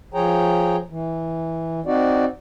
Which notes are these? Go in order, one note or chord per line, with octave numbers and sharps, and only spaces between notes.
F3 G#4 C#5 G5 A#5
E3
C4 D#4 F#4 D5